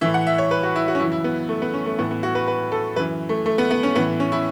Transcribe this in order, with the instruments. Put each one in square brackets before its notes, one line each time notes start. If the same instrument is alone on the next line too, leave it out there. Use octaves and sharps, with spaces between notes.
[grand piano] A2 E3 E5
F#5
E5
C#5
B4
F#4
E4
F#4
C#4
F#2 C#3 E3 E4
E4
B3
A3
B3
C#4
A3
A2 E3 B3
B3
F#4
B4
B4
A4
F#2 E3 B4
A3
A3
B3
B3
C#4
A2 E3 B3
C#4
E4